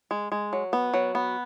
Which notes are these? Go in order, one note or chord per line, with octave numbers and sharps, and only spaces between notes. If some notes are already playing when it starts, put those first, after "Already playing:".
G#3
G#3
F#3
B3
F#3
B3